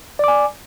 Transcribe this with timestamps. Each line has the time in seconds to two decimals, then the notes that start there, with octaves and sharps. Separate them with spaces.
0.19 D5
0.24 D6
0.28 G#5